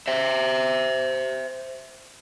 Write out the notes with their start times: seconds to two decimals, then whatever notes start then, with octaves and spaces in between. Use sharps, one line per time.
0.08 C5 E5